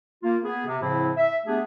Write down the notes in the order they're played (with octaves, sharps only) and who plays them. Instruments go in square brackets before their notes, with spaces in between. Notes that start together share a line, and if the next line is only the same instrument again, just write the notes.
[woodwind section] A#3 F4
B3 G#4
C3
A2 C#3 F3 C4 E4
E5
A3 B3 D4 G4 G#4